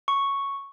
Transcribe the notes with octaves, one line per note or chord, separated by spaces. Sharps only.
C#6